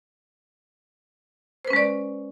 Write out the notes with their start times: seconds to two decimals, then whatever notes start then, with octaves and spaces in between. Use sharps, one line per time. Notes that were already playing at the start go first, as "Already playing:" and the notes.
1.65 C5
1.67 B4
1.70 C#4
1.73 G#3
1.76 D5